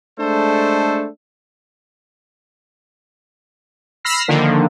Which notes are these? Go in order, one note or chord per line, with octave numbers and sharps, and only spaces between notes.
G#3 A3 D4 A4 C5
B5 E6 F6 A#6 C7
D3 D#3 F3 A#3